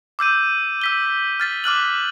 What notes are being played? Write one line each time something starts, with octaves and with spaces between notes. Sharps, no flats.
D6 E6 G6 D#7
E6 B6 G7
F6 A6 B6
D6 F6 F#6 F#7